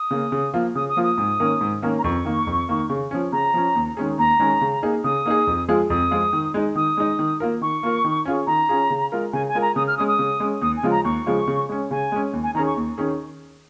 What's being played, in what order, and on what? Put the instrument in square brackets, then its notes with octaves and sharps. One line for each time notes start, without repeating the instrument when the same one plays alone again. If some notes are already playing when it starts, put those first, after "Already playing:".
Already playing: [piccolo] D#6
[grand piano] C#3 A#3
C#3
F3 A#3 F4
[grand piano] C#3 [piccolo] D#6
[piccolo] D#6
[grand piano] F3 A#3 F4
[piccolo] D#6
[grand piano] G#2
D#3 A#3 C#4 A#4
G#2
D#3 A#3 C#4 A#4
[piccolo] A#5
[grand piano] F2 [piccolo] C#6
[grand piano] D#3 A#3
F2
D#3 A#3
C#3
F3 C#4
[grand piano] C#3 [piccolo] A#5
[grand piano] F3 C#4
D#2
D#3 G#3 C#4 G#4
[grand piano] D#2 [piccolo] A#5
[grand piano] D#3 G#3 C#4 G#4
C#3
A#3 D#4 G#4
[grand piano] C#3 [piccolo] D#6
[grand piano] A#3 D#4 G#4
F2
F3 G#3 F4 G#4
[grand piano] F2 [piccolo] D#6
[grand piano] F3 G#3 F4 G#4
D#3
G#3 D#4
[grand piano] D#3 [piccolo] D#6
[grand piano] G#3 D#4
D#3
A#3 F4 A#4
[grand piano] D#3 [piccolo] C#6
[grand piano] A#3 F4 A#4
D#3
C#4 F4 G#4
[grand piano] D#3 [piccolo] A#5
[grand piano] C#4 F4 G#4
C#3
G#3 F4 A#4
[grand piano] C#3 [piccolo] G#5
[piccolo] G#5
[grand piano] G#3 F4 A#4
[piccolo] A#5
[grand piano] C#3 [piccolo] D#6
[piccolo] F6
[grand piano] G#3 C#4 [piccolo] D#6
[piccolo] D#6
[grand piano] C#3
G#3 C#4
[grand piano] D#2 [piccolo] D#6
[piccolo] G#5
[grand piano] C#3 F3 G#3 F4
[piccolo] A#5
[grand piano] D#2 [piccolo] C#6
[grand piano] C#3 F3 G#3 F4
C#3
G#3 C#4
[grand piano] C#3 [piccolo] G#5
[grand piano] G#3 C#4
D#2
[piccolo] G#5
[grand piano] D#3 C#4 G#4 [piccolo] A#5
[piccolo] C#6
[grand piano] D#2
D#3 C#4 G#4